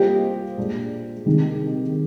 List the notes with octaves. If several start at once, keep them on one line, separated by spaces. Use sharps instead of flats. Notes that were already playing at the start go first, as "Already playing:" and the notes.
Already playing: G3 A#3 F4 G4 C5 D#5
A#2 G#3 D4
C3 D#3 G#3 D#4